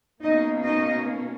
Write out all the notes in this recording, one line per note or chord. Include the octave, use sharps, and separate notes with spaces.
B2 A#3 C#4 D#4 D#5
D#4 D#5